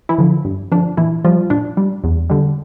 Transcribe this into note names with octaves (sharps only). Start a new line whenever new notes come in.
E3 E4
D3 F3
G2
D3 F3 D4
A#2 E3 E4
F3 G3 F4
A#2 D4
G3
E2
D3 G3